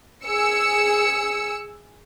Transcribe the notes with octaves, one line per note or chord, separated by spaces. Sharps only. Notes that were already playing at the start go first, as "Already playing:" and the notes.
G#4 E6 C#7